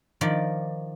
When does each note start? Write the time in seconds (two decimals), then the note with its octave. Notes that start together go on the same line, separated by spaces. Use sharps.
0.21 D#3 F3 D5